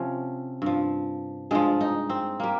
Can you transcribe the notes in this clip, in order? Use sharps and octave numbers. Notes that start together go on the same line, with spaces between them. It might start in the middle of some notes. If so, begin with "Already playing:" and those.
Already playing: C3 F3 C#4
G2 F3
G2 F3 G#3
D#4
C4
G3 A#3